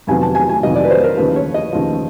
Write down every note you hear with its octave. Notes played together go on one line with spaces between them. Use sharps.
F2 C3 D#3 F#3 B3 G#5
A5
G#5
G#5
F2 C3 D#3 F#3 B3 D#5
D5
B4
C5
A#4
D#2 C#3 F3 B4
C#5
D#5
D#2 C#3 F3